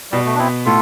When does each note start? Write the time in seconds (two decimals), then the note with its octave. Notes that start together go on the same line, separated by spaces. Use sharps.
0.11 B2 G3
0.26 A3
0.34 D4
0.38 B3 C4 E4
0.65 A2 F4 A4